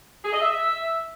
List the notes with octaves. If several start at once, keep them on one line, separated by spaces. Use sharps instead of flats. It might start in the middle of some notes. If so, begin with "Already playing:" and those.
G#4
D#5
E5